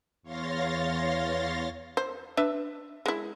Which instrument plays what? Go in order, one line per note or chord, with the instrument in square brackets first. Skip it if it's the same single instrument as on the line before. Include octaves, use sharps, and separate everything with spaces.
[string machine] E2 C#5 F5 C6 A6 A#6
[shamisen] C5
D4 B4 E5
G#3 E4